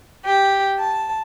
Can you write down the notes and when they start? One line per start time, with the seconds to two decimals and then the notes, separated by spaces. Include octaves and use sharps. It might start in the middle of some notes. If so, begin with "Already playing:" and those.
0.24 G4
0.77 A5